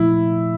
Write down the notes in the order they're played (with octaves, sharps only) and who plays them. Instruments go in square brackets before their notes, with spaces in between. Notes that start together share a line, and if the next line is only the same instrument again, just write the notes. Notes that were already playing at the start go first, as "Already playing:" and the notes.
Already playing: [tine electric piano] A#2 F3 A3 [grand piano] E4